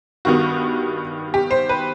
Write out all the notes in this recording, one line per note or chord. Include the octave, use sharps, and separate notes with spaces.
G2 D#3 G3 B3 F#4
G4
C5
B4